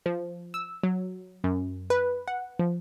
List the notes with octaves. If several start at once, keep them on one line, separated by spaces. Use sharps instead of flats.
F3
E6
F#3
F#2
B4
F#5
F3